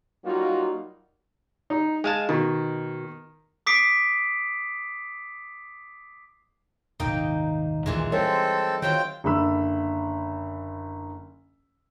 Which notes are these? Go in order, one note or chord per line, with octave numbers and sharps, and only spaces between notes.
F#3 G3 A#3 D#4 F4 F#4
D#4
G#3 F5 G#5 A5
B2 D#3
D6 D#6 B6 C7 D7
D#1 G#1 C3 A#3 D#4 G5
A#1 D#2 A#2 D#3 E3 G#3
G3 G#3 C4 A4 A#4 C#5
D#3 F#3 C4 F4 G5
F#1 D3 B5 E6